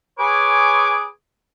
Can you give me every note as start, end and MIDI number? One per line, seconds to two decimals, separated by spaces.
0.18 1.04 68
0.18 1.04 71
0.18 1.04 73
0.18 1.04 80
0.18 1.04 85
0.18 1.04 86